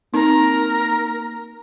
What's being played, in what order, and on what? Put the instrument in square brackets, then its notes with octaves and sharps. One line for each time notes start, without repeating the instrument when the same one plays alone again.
[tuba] A#3 [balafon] C4 D#4 [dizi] A#4